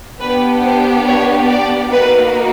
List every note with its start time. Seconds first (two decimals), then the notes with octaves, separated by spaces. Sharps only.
0.20 B3 D4 G4 B4
0.63 C5
1.06 C#5
1.49 D5
1.92 A#3 D#4 F#4 B4